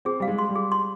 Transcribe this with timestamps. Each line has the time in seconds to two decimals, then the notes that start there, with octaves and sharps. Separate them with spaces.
0.05 C4 G#4
0.20 G3 F5
0.28 G#3
0.38 C6
0.49 G3
0.56 G#4
0.72 C6